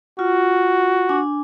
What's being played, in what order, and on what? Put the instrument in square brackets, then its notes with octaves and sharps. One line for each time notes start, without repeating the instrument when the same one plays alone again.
[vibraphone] F4 [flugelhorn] F#4
[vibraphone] D4 G#5